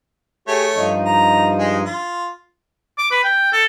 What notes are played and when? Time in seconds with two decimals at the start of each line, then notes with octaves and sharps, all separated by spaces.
0.48 A3 G4 G#4 C#5
0.75 G2 F3 D#4
1.06 A#5
1.60 G#3
1.85 F4
2.98 D6
3.11 B4
3.24 G5
3.53 A4